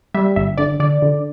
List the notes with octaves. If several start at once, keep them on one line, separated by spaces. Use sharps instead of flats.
G3 E5
G1 E5
D3 D5
D3 D5
D3